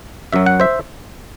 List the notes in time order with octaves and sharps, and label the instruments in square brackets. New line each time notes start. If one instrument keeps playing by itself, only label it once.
[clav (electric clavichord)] F#2 F#3 E5
F#5
C5 E5